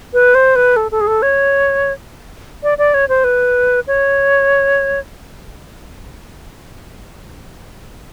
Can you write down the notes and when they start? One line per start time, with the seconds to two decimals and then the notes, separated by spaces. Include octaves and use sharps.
0.14 B4
0.35 C5
0.56 B4
0.76 A4
0.91 A4
1.01 G#4
1.07 A4
1.22 C#5
2.63 D5
2.78 D5
2.94 C#5
3.09 C5
3.24 B4
3.87 C#5